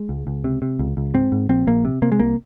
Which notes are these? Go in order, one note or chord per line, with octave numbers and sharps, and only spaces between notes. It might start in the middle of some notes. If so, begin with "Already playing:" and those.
Already playing: G#3
C#2
C#2
C3
C3
C#2
C#2
G#2 C4
G#2
A#1 C4
A#1 A#3
C3
C3 A#3
G#3
C2 A#3